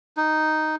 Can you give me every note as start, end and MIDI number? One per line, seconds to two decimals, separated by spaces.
0.17 0.76 63